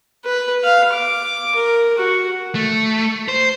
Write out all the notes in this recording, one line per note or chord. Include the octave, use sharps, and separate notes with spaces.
B4
F5
D6
A#4
F#4
A3
C5